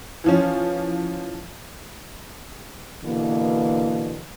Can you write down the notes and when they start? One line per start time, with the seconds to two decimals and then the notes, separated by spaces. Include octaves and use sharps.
0.24 E3 F3 C#4
3.05 B2 D3 E3 A#3